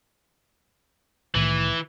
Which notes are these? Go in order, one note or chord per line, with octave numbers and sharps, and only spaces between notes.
C2 A2 D#3 E3